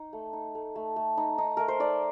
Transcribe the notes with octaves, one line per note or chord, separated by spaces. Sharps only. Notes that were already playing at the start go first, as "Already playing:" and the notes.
Already playing: D#4
A3
D#4
A3
A3
A3
D#4
D#4
A3 A#4
C5
D#4 D5